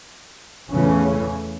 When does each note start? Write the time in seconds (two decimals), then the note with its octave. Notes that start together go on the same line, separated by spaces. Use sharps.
0.72 E2 C#3 E3 A3 C#4